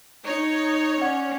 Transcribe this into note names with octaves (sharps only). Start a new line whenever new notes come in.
D#4 C#5
C#4 D5 F#5 G#6